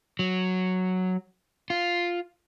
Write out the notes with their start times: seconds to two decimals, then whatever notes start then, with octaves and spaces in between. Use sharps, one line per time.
0.19 F#3
1.70 F4